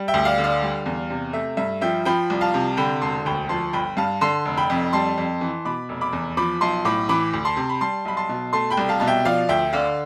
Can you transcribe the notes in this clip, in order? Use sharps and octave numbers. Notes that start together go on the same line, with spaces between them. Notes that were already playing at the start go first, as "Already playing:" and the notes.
Already playing: G3
E5 G5
D2
D5 F5
D3
D5 F5
G3
E2
C3
A3 E5
G2 E5
F3 E5 G5
F3 G5 B5
C2
F5 A5
C3
D3 G5 B5
E1 A5 C6
D2 G5 B5
F3 A5 C6
G1 G5 B5
G2 F5 A5
D3 A5 C6
F1
G5 B5
F2
G3 A5 C6
F2
E3
B2 B5 D6
F1
B5 D6
E2
F3 B5 D6
B1 A5 C6
A2 B5 D6
E3 B5 D6
D2
A5 C6
C3
B5
G3 A5 C6
B1 B5
A5 C6
B2
A3 A5 C6
G5 B5
C2
F5 A5
B2 A5
E5 G5
F3 D5 F5
D2 E5 G5
D3 D5 F5